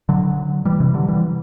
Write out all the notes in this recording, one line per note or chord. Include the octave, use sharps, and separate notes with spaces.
D3 F#3
E3 G3
C3 E3
D3 F#3
E3 G3